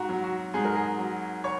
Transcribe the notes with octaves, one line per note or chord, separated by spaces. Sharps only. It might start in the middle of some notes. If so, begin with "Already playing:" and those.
Already playing: G#2 F#4
F#3
F#4
G#2 G#4
A#4
G#4
F#3
C#5